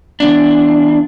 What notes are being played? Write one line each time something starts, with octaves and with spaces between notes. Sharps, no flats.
E2 D4